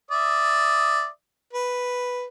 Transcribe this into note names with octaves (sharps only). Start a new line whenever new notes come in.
D5 E5 D#6
B4